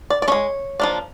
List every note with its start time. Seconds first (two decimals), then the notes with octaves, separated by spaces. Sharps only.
0.10 D5
0.22 D5
0.28 G#3 C#4 C#5
0.80 F3 A#3 D4